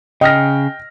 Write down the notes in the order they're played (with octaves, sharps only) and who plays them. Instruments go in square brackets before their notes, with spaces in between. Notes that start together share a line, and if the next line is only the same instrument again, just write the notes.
[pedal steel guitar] C#3 [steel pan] D#5 [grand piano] G5 F6 A#6